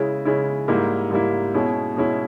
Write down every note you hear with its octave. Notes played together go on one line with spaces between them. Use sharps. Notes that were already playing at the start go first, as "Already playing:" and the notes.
Already playing: C#3 G#3 C#4 E4
C#3 G#3 C#4 E4
G#2 G3 A#3 E4
G#2 G3 A#3 E4
B2 G#3 C#4 E4
B2 G#3 C#4 E4